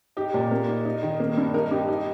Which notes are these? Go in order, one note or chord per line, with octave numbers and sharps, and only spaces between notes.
D#4 G4
A#2
A#3
D#4
D#4
D#3
A#3
G2
D#4 A#4
G2 G4
D#4